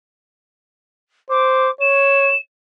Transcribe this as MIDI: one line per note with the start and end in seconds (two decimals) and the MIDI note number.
1.30 1.69 72
1.30 1.71 86
1.81 2.35 73
1.81 2.38 100